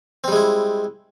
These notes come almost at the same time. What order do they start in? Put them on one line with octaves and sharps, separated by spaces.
C4 G3 G#3 E4